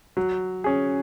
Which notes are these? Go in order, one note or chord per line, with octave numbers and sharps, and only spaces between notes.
F#3
C#4 G#4